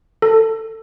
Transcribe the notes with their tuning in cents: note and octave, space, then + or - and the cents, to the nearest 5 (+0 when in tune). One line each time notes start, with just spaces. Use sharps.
A4 +20